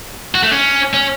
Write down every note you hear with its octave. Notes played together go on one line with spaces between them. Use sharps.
F#4
A3
C#4
C#4